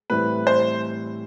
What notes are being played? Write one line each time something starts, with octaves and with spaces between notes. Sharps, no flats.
A2 E3 G3 C4 E4 B4
C5